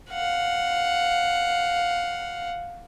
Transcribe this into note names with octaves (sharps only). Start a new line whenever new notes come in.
F5 F#5